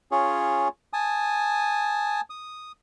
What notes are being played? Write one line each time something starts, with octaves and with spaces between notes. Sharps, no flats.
C#4 F4 G#4 C#5
G#5 A5 D#6
D#6